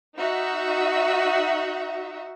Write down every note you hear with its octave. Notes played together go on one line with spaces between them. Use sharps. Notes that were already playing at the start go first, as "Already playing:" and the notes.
D#4 F#4 E5